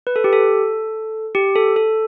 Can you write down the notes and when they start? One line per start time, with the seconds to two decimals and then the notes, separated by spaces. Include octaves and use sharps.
0.07 B4
0.16 A4
0.24 G4
0.33 A4
1.35 G4
1.56 A4
1.76 A4